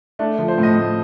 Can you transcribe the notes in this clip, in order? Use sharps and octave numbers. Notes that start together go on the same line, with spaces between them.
A3 D4
F3
C5
A2
D#5
A2